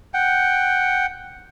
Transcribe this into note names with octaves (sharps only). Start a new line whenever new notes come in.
F#5 G5